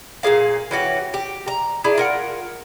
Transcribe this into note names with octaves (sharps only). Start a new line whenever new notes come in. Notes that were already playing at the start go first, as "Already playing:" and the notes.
A#2 G4 G#4 F5
E3 C#4 F#4 G4
G4
A#5
D4 E4 G#4
F4 A#4 F#5